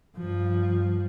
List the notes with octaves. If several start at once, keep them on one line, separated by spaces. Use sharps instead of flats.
G2 F3